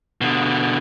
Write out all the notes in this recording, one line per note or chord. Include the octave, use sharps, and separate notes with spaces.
B2 D3